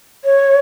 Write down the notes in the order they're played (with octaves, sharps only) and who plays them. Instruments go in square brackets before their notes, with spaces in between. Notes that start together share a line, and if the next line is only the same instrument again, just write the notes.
[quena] C#5